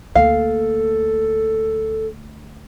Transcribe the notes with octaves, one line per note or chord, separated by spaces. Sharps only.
D2 A#3 A4 F5